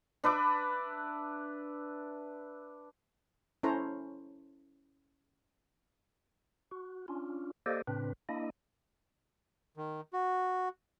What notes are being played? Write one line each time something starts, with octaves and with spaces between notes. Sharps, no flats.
D4 B4 E5 D6
C#4 E4 A4 C5 C#5 A#5
F#4
C#4 D4 F4
A#3 G4 A4 C5 D5 D#5
A2 C#3 C4 D4 B4
A#3 D4 E4 D#5
D#3
F#4